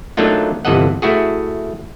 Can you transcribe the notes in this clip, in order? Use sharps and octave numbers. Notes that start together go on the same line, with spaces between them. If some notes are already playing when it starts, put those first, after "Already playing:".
F#3 A3 A#3 D4 D#4 F4
G1 C3 E3 A4 D#5 F#5
A3 E4 F#4 G#4